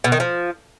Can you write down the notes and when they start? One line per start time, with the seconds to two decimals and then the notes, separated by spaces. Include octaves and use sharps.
0.04 B2
0.12 D#3
0.20 F3